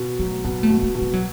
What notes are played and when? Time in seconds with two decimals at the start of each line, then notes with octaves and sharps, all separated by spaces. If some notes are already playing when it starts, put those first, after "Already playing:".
Already playing: B2
0.19 F#3 A3
0.44 B2 B3
0.63 A3
0.70 B2
0.83 G#3
0.95 B2
1.02 G#3
1.13 F#3